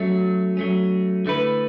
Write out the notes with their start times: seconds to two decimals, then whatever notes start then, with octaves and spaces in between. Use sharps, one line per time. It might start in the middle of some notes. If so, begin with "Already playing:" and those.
Already playing: F#3 A3 C#4
0.57 F#3 A3 C#4
1.26 D3 A3 E4 B4